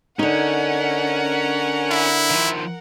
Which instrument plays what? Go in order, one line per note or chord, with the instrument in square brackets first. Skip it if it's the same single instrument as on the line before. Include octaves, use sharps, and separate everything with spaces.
[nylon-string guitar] D3 D#4 [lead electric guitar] C#4 [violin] A#4 F#5
[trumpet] E4
[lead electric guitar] D#3 F3